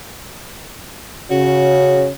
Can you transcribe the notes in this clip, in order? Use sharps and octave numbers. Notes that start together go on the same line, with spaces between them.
C#3 F#4 C#5